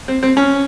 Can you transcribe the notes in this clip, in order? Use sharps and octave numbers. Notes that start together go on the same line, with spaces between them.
C4
C4
C#4